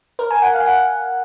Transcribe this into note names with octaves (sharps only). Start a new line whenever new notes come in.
A#4
G#5
F#5
F5
F#5